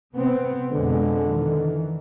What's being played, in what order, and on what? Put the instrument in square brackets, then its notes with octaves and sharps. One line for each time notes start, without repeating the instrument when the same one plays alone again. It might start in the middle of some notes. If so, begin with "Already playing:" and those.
[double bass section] C3 B3 C4
[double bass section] F2 B2 G#3 [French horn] D3
[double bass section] D#3 E3